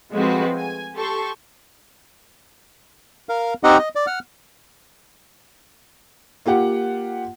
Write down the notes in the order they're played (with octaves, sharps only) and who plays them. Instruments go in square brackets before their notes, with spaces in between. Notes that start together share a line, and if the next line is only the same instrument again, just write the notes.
[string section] F3 G#3 A3 C4 F#4 B4
G#5
G4 A4 C6 C#6
[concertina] A#4 F5
C4 D#4 G4 D#5 F#5
D#5
D5
F#5 F6
[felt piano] A#3 F4 G4 F#5